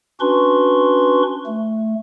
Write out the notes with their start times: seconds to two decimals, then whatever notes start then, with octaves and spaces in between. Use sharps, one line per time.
0.20 C#4 D4 F#4 B4 C6 C#6
1.46 A3